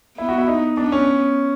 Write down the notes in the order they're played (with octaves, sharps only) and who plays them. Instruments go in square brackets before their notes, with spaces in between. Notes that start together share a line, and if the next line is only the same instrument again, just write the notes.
[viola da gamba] B3 [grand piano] E4
[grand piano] F#4
E4
D#4
[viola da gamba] B3 [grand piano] D4
[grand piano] C#4